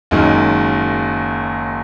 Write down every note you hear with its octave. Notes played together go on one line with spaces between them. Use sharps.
F#1 F#2 D#3 G#3